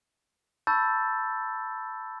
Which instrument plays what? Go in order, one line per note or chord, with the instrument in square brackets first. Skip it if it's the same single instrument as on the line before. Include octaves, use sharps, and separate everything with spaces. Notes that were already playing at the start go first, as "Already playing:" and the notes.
[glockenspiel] A5 B5 C#6 E6 G6 A6